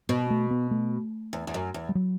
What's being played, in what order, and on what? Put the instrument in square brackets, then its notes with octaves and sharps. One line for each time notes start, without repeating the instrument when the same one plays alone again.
[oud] B2 [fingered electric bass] B3
[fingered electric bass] A3
B3
A3
[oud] E2
E2
F#2
E2
[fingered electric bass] G3
F#3